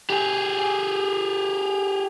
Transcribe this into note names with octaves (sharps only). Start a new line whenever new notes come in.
G4 G#4